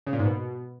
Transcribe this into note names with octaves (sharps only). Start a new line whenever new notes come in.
C#3
A#2
G#2
B2